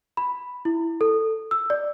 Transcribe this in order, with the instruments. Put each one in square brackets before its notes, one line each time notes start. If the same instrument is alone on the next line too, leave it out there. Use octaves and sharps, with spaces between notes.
[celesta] B5
E4
A4
E6
D5